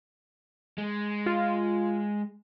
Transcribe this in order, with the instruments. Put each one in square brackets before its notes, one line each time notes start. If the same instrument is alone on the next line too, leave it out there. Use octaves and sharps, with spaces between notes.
[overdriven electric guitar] G#3
[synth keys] F4